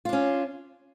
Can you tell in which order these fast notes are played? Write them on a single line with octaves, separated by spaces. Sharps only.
F4 D4 C#4